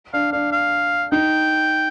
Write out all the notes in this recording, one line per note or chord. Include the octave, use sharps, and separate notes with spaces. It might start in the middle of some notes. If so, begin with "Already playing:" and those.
D4 F5
D4 F5
F5
D#4 G5